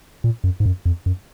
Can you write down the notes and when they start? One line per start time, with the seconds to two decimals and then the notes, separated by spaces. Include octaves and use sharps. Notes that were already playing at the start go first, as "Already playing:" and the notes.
0.24 A#2
0.44 F#2
0.60 G#2
0.66 F#2
0.85 F2
1.06 F#2